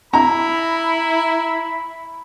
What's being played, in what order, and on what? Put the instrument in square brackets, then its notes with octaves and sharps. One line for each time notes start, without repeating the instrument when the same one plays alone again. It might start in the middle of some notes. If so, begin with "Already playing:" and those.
[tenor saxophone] E4 [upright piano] A#5 [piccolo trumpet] B5